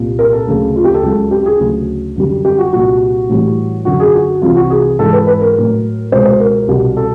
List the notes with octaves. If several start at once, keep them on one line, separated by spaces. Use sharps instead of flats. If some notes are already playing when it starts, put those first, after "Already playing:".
Already playing: C2 A#2 G3
A#4
A4
D2 C#3 F#3
F4
G4
A4
C#2 C#3 F#3
G4
G#4
D2 C#3 F#3
F#2 D3 G3
G4
F#4
C2 A#2 G3 F#4
A2 E3 G3
F#2 D3 F#3 F#4
G#4
F#4
C2 C3 E3 G3 F4
F#4
G#4
G#2 E3 G#3 A4
B4
B4
A#4
A2 F#3
C#2 B2 G#3 C5
C5
A#4
C2 B2 G3
A4